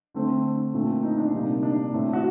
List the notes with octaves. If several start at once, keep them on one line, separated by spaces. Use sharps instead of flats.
D3 A3 C4
A#2 A3 C4
D#4
D4
C3 G3 A#3 D#4
D4
A2 A3 C4
F#4